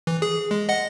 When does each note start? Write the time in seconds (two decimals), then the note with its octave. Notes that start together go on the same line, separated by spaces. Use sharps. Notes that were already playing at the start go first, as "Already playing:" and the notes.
0.07 E3
0.22 G#4
0.51 G#3
0.69 D#5 F#5